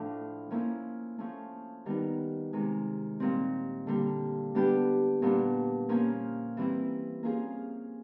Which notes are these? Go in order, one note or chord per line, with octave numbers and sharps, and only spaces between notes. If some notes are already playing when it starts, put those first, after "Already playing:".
Already playing: A2 F3 A3 D4
F3 A#3 C#4 E4
F3 A3 C#4
D#3 G3 B3 D#4
C3 D#3 G#3
A#2 G3 C4
D3 G3 A#3
G3 B3 D4 G4
A#2 G3 B3 D4
F3 A#3 C#4
E3 G3 C4 E4
F3 A#3 C#4 F4 G#4